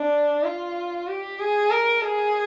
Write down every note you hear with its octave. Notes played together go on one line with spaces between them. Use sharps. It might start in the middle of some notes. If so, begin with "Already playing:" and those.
Already playing: D4
F4
G4
G#4
A#4
G#4